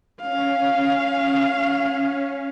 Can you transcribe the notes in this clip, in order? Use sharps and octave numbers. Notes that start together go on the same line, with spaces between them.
C#4 F5